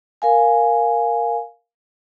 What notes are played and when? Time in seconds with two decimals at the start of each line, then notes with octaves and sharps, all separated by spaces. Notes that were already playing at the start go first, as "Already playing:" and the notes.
0.22 A#4 F5 G#5